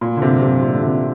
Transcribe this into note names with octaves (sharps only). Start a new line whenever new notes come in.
A#2
D3
C3
C3
A#2
D3
C3